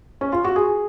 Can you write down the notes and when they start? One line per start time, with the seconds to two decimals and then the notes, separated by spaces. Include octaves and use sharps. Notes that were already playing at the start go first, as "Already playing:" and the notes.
0.21 C#4
0.32 F4
0.44 F#4
0.56 G#4